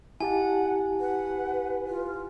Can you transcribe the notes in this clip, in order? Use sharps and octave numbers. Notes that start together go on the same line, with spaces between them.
E4 G4 F#5 G#5 A5
B4 F#5
F4